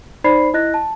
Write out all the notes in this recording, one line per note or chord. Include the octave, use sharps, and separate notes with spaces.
D#4 C5 D5 B5 C7
E4 D#5 F#6 A#6
A5